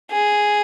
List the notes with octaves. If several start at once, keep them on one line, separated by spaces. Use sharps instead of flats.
G#4